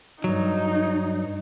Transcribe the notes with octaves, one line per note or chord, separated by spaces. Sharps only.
G2 F#3 D#4